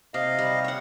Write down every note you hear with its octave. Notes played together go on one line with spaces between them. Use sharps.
C3 D#5 F5
G3
C#5 F#5